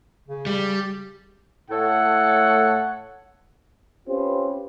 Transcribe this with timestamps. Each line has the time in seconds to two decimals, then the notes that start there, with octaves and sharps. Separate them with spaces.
0.28 C#3
0.46 G3
1.71 A2 A3 A4 C#5 F#5
4.08 C4 C#4 F4 G4 B4 C5